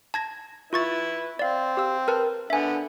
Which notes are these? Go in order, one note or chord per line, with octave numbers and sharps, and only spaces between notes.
A5 G#6 A#6
E4 F4 B4 C#6 A6
C4 D5 F5
G4 F5 E6
A#4 B4 A5
D3 B3 E5 G#5